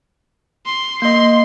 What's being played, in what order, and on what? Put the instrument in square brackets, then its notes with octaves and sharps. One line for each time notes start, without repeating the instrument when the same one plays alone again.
[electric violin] C6
[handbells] A#3 D#5 [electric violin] C6